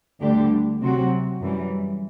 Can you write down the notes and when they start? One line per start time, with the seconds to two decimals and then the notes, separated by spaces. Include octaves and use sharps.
0.21 D2 D3 G3 D4 G4
0.82 C3 F#3 C4 F#4
1.41 F#2 E3 G3